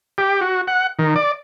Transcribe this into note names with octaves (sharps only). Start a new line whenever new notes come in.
G4
F#4
F#5
D#3
D5